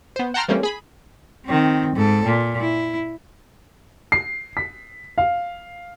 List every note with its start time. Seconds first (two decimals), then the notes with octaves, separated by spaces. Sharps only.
0.16 B3 C5
0.34 F#5 G5 A5 A#5 C6 F6
0.48 E3 G3 A3 A#3 C4 C#4
0.63 G#4 B5
1.45 D#3 C4
1.96 G#2 A4
2.25 A#2
2.61 E4
4.12 C7
4.57 B6
5.18 F5